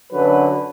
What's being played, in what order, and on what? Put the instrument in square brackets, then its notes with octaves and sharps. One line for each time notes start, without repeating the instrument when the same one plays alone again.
[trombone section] F#2 D3 F#3 B4